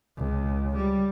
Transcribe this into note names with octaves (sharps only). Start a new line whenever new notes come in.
C#2
G3